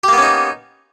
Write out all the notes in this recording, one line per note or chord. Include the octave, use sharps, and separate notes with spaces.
A#3 B3 C#4 D#4 G4